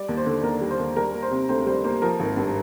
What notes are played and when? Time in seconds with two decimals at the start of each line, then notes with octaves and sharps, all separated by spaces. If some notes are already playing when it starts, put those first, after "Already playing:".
Already playing: G3 D5
0.09 D#2
0.17 C5
0.26 D3
0.43 D#2 A#4
0.61 G3
0.71 C5
0.79 D#2
0.96 G3 A#4
1.13 A#3
1.23 C5
1.31 C3
1.49 D2 C5
1.66 G3 C5
1.84 A#3 C5
2.02 F3 A#4
2.20 G#1
2.37 G2